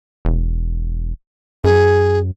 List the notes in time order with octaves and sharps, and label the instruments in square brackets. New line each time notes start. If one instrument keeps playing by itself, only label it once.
[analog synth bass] E1
[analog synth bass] F#2 [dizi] G#4